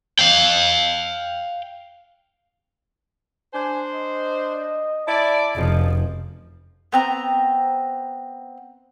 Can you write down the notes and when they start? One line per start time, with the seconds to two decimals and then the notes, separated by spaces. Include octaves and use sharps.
0.19 F5 G5
3.54 D4 C5 G#5
3.94 D#5
5.07 E4 D5 A5
5.57 F1 F#2 C#3 F3 D#5
6.92 B3 C4 A#5